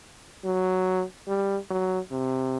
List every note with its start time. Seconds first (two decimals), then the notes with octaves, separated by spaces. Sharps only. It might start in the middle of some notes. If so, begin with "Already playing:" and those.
0.45 F#3
1.28 G3
1.70 F#3
2.11 C3